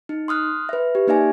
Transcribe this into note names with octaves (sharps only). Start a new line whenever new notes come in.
D#4
C6 D#6 F6 F#6
B4 E5
G4
A#3 D#4 D5 E5 G#5